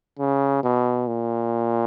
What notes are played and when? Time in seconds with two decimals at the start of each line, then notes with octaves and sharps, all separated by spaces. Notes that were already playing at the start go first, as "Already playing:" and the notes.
0.19 C#3
0.63 B2
1.07 A#2